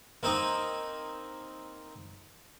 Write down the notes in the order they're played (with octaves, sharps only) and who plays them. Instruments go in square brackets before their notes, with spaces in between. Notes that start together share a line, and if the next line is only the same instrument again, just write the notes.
[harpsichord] A#3 C4 D#4